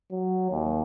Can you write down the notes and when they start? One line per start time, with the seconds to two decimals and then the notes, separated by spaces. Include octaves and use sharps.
0.11 F#3
0.51 D#2